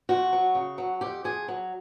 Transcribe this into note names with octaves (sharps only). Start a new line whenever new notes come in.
F2 F#4
F#3
C#3
F#3
F2 G4
F2 G#4
F#3